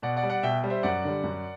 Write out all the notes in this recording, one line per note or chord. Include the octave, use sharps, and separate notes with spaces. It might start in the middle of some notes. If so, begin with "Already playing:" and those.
B2 D5 F#5
D5 F#5
G3
D5 F#5
B2 E5 G5
G3
C5 E5
F#2 D5 F#5
D3 G3
F#2